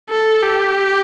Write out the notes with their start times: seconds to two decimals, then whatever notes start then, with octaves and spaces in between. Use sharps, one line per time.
0.10 A4
0.43 G4